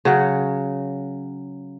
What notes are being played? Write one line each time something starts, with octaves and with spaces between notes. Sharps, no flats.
C#3 F#3 F#5